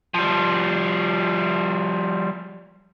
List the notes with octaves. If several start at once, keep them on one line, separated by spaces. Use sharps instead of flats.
F3 G3